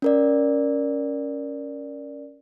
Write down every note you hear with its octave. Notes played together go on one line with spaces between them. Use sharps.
C#4 A#4 D5